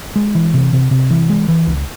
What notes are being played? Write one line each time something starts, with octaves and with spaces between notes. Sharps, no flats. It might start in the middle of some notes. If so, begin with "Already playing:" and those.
G#3
E3
C3
C3
C3
E3
G#3
E3
C#2